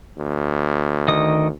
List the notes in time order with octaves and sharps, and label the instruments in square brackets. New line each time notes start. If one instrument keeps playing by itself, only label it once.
[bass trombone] D2
[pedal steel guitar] D#3 D#5 D#6